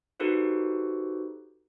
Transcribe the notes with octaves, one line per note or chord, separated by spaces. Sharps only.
D#4 F#4 G4 A4 B4 C5